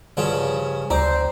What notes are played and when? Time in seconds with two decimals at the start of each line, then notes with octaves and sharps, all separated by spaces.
0.17 G2 C#3 F3
0.90 D2 C4 C5 D5 A#5